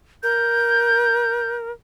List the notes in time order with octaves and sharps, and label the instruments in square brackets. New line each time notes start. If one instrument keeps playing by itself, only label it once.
[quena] A#4 [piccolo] G6